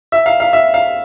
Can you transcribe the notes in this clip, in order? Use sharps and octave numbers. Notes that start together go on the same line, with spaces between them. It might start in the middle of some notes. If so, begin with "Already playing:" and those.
E5
F5
F5
E5
F5